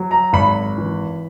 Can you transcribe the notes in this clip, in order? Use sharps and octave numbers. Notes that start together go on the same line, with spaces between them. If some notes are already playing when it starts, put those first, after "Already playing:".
Already playing: F#3
A#5
G#1 B5
E3